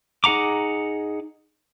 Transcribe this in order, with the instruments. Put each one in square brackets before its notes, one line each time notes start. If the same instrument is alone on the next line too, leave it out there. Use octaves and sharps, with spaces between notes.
[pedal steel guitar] D#4 G#4 F#5 A#5 D6